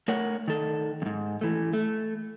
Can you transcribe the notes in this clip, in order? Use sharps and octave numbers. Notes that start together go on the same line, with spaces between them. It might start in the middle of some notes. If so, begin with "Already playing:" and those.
A3 A#4 C#5 F#5
D#3 A4
F2 G#2
E3 A3
A3